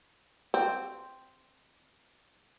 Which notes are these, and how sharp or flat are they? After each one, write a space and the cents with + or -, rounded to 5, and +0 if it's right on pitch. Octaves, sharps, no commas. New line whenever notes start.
C4 +0